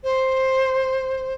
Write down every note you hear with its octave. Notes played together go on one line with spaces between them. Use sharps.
C5